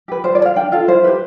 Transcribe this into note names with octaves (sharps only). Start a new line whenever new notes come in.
G4 B4
F4 C5
D5
A4
F5
D4 G5
F4 A4 F5
E4 C5
G4 B4